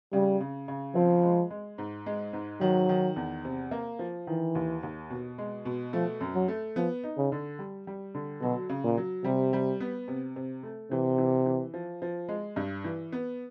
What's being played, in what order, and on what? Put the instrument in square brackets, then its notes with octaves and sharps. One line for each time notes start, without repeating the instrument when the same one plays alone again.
[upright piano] C#3 [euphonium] G3
[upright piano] C#3
C#3
[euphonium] F3 [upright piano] C4
[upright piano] G#3
G#3
G#2
G#3
G#2
[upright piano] D#3 [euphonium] F#3
[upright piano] D#3
E2
C3
A#3
F3
[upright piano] D#3 [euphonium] E3
[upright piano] D#2
D#2
B2
G#3
B2
[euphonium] F3 [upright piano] A3
[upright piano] F#2
[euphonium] F#3
[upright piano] A3
[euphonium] F3 [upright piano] B3
[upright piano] D#4
[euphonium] C#3
[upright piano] D3
G3
G3
D3
[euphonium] B2 [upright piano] F#3
[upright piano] C#3
[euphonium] A#2
[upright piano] F#3
[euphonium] C3 [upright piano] G3
[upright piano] G3
B3
C3
C3
A3
[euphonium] C3 [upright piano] E3
[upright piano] E3
E3
F3
F3
G#3
G2
E3
B3